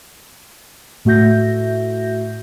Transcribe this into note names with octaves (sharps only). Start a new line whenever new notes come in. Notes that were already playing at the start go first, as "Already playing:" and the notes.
A2 A3 F#4 E5 G6 A#6